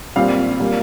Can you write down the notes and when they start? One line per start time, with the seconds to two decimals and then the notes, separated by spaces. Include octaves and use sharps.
0.16 A#2 G3 C4 F5
0.59 A#2 G3 A#3